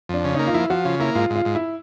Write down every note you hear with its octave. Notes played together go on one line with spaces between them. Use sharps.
F2 D4
C#3
A#3 D#4
F4
F3 E4
F3 F#4
C#3 F4
A#3 E4
G#2 F4
G#2
F4
G#2
E4